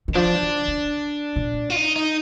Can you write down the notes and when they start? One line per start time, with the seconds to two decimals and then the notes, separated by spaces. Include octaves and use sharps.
0.08 D#3
0.15 F3 D4
0.41 D#3
0.68 D3
1.36 A#2
1.70 F4
1.76 D#4
1.96 D#4